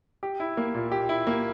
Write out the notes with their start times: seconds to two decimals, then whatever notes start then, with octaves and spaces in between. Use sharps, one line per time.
0.23 G4
0.40 E4
0.57 A#3
0.74 A#2
0.92 G4
1.09 E4
1.27 A#3